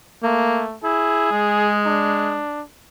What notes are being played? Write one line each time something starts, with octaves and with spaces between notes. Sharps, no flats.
A3 A#3
E4 G#4
G#3
D4